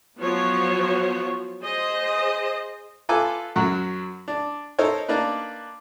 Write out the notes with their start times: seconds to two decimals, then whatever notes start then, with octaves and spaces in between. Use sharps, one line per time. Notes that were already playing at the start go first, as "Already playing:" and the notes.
0.19 F3 F#3 B3 F#4 C5 C#5
1.63 G#4 C5 D#5
3.09 F4 A4 B4 G#5 D6
3.56 F#2 F#3 F#5
4.28 D4
4.79 D#4 A4 A#4 C5 C#5
5.08 A#3 D4 D#4 B4